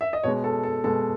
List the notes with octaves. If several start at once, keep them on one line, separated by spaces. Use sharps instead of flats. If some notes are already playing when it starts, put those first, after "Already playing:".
E5
D#5
B2 G#3 C#5
A4
A4
B2 G#3 A4